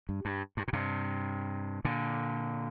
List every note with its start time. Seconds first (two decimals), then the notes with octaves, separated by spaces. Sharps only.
0.09 G2
0.25 G2
0.57 G2
0.68 A#2
0.73 G2 C3
1.85 A#2 D3